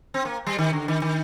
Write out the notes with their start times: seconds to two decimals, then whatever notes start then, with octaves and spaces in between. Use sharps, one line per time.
0.14 C4
0.25 A#3
0.47 G3
0.58 D#3
0.73 D3
0.88 D#3
1.02 D#3